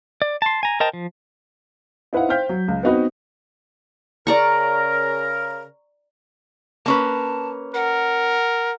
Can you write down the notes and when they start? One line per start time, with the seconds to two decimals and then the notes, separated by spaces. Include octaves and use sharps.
0.22 D5
0.42 A5 C6
0.63 G#5 A#5
0.80 A#4 C5 D#5 G5 A5
0.93 F3
2.13 D#4 E4 B4 C5 F5 F#5
2.29 C5 F5 G5 F6 G6 B6
2.49 F#3
2.68 C#2
2.83 B3 C4 D#4 F#4 B4
4.27 C#3 A#4 D5 A#5 C#6
6.86 A#3 C#4 B4 A5
7.75 A#4 F#5